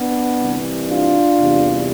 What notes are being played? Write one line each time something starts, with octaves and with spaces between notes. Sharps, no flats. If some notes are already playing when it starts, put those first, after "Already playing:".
Already playing: B3 D4
C2 C3 E3 G3
D4 F4
E2 C3 E3 G3